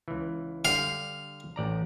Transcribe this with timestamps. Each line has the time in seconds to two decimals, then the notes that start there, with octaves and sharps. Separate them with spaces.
0.08 C#2 E3
0.65 D3 G3 F5
1.56 A1 D5 A#5